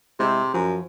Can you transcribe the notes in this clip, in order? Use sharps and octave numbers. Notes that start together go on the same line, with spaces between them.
C3 G#3 E4 E6
F#2 F3